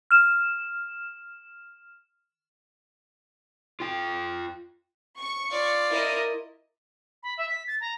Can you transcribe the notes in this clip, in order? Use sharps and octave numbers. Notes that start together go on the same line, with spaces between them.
F6 E7
F4 G5
C#6
F4 D5
E4 A#4 D#5
B5
E5
B6
A6
A#5